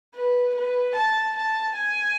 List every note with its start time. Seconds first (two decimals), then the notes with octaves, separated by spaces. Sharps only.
0.15 B4
0.55 B4
0.96 A5
1.37 A5
1.77 G#5